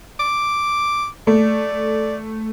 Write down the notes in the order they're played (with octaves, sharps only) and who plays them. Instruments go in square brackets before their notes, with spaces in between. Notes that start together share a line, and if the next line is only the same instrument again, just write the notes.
[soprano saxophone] D6
[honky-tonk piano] A3 [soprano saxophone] D5